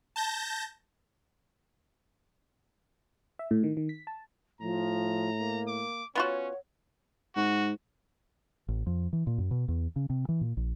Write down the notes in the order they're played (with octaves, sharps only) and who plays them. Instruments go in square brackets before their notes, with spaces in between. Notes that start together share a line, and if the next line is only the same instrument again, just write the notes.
[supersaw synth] A5 G6 A#6
[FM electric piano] E5
A2
D#3
D#3
B6
A5
[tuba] A2 [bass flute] F3 [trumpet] A#5
[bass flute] A#3
[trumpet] D6
[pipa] B3 F4 F#4 [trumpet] C#4 [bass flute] C#5
[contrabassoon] G#2 [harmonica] F#4
[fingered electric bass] A1
F2
E3
A#2
F#2
B2
E2
C#3
C3
E3
A#2
A#1